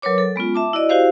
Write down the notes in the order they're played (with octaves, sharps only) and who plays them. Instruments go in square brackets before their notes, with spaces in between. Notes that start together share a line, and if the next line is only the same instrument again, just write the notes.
[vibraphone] F#3 A#4 B4 C#5 D6
A4
G#3 B3 C#4 F4
E5 A5 D6
E4 F#4 D5 D#5
E4 F#4 G4 C5 F5